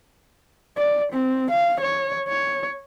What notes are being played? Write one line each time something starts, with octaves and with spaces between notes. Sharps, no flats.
D5
C4
F5
C#5
C#5